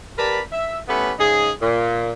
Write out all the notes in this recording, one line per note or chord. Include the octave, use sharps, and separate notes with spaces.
G4 A#4 B4 D5 A5 B5
E5
A2 A3 B3 C#4 G4 B4
G#2 C#3 D#4 G#4
A#2